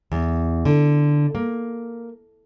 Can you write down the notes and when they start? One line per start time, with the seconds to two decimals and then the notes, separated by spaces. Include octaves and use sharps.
0.12 E2
0.65 D3
1.35 A#3